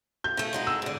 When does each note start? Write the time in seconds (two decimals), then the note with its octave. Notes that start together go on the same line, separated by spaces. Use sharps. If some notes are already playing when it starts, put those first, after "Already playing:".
0.24 G6
0.37 C#3 A3
0.53 F#3 G#3 D#4
0.67 E6
0.82 G#2 D3